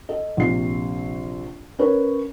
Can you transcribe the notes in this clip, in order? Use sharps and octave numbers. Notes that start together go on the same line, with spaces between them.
A4 D#5
A#1 C3 C7
C#4 A#4 B4 C#5